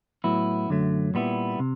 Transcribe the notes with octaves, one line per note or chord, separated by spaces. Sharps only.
A2 F#3 B3 E4
F#2 D3 F#3 A3
A#2 G3 B3 E4
C3